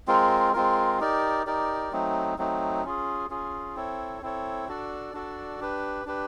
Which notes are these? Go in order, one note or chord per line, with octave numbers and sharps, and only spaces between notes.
G#3 C4 F4 A#4
G#3 C4 F4 A#4
D#4 G4 A#4 D5
D#4 G4 A#4 D5
F#3 A3 C4 D#4
F#3 A3 C4 D#4
C#4 F4 G#4
C#4 F4 G#4
C4 E4 A4 C#5
C4 E4 A4 C#5
D4 F#4 A4 D5
D4 F#4 A4 D5
D4 G4 B4
D4 G4 B4